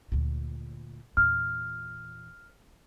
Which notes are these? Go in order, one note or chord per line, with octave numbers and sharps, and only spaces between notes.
D2 A#2
E2 A#2 F6